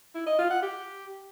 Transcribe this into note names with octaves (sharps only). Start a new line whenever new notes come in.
E4
D#5
F4
F#5
G4